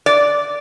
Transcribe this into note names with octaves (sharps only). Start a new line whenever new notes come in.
D5